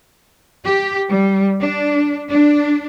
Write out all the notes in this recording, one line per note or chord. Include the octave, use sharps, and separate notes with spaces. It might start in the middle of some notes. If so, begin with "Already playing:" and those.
G4
G3
D4
D4